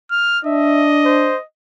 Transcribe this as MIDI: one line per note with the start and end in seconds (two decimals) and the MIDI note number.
0.11 0.39 89
0.45 1.32 62
0.45 1.44 75
0.45 0.88 76
1.05 1.38 72